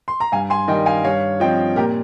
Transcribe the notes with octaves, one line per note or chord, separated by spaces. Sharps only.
C6
A#5
G2 F5 G#5
G#5 C6
D#3 G3 D#5 G5
F5 G#5
G2 C#5 F5
F3 C4 D#5 G5
A#2 G4 A#4